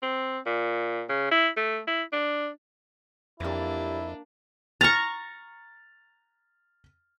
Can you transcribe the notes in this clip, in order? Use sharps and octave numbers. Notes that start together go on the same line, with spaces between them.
C4
A#2
C#3
E4
A3
E4
D4
F2 E3 G3 A#3 D4 E4
A#5 C#6 F6 A6